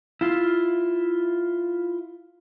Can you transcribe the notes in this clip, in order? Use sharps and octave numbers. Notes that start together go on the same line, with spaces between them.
E4 F4